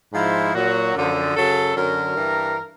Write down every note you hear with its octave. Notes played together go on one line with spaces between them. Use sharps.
G#2 F3 E4
A#2 F#3 F#4
F#2 D3 F3
F#2 C#3 F#3 A4
F#2 D3 F#3 A#4
G2 E3